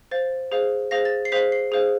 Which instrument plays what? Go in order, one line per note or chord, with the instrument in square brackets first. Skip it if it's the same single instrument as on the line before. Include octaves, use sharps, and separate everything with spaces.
[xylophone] C5 F5 A6
G#4 C5 F5
G#4 C5 F5 A#6
A6
C7
G#4 C5 F5 B6
C7
G#4 C5 F5